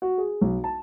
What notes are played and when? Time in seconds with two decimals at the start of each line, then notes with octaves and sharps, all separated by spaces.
0.02 F#4
0.18 G#4
0.41 B1
0.64 A5